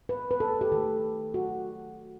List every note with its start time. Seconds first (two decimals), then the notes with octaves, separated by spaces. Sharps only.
0.09 B4
0.31 B4
0.40 A4
0.61 G4
0.72 D#3 A4
0.77 A3
1.34 F#4